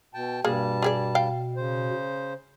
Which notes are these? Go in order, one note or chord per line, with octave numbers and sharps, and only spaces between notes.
B2 G5 A5
G2 B2 G3 A#3 G#4 A5
G4 G#4 D5
F5 G5
C#3 C5